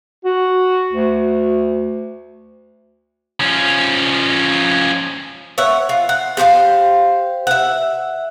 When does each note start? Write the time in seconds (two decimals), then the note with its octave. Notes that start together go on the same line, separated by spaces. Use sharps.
0.25 F#4
0.93 D2
3.40 F3 C#4
5.58 C#5 E5 F#5
5.89 F4
6.09 F#5
6.37 G4 C5 D5 F5
7.47 E5 F#5